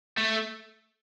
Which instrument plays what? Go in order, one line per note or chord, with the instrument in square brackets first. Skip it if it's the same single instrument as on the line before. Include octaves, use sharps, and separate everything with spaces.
[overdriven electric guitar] A3